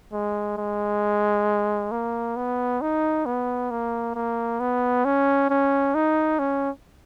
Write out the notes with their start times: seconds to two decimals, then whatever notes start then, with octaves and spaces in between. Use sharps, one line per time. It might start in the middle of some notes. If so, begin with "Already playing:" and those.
0.13 G#3
0.58 G#3
1.92 A#3
2.36 B3
2.82 D#4
3.26 B3
3.71 A#3
4.15 A#3
4.60 B3
5.05 C#4
5.50 C#4
5.95 D#4
6.39 C#4